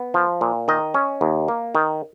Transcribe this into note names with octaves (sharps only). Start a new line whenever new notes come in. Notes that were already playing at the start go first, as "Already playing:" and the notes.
Already playing: B3
F3
A#2
D#3 D#5
C#4
D#2
A#3
D#3